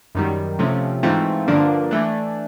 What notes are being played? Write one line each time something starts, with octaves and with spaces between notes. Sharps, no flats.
F#2 D#3 G3
C3 F3 A3 C#4
G#2 E3 A3 C4 F4
G2 D3 F3 A#3 D4
E3 A3 D4